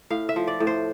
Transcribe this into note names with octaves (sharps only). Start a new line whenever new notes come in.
A2 F5
E5
F3
D5
A2
C5